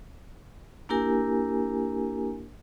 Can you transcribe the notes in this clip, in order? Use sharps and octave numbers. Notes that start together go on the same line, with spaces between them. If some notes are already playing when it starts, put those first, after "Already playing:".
A#3 D4 E4 G4 A#4 G#5